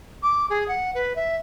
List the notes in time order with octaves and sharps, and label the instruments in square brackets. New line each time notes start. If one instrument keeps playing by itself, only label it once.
[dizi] D6
G#4
F#5
B4
E5